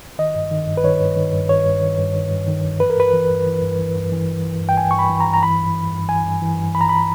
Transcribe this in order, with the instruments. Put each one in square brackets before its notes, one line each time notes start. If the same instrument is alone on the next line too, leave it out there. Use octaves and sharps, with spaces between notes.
[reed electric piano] D#3 D#5
G2
D#3
G2
B4
D#3 C#5
G2
D#3
G2
D#3 C#5
G2
D#3
G2
D#3
G2
D#3
G2
E3 B4
A#4
G2 B4
E3
G2
E3
G2
E3
G2
E3
G2
E3
G2
G5
E3 G#5
C#6
G2 B5
E3
A#5
G2
A#5
E3 B5
G2
E3
G2
E3 G#5
G2
E3
G2
E3 B5
A#5
B5